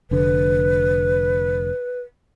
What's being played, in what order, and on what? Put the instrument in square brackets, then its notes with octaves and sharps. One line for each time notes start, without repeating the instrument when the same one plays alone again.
[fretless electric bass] F1 D3 [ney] B4